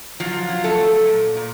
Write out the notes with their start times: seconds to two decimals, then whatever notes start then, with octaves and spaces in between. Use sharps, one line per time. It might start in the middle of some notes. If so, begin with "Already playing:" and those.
0.20 F3 F#3 F4
0.49 F#3
0.64 A3 A4
0.78 F#3
1.07 A#2
1.36 A#2